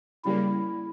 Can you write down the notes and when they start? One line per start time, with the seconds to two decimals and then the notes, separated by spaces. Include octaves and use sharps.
0.25 C#3 G3 A#3 E4